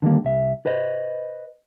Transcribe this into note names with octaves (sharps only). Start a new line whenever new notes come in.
D3 D#3 G3 A#3
C2 E5
B4 C5 D#5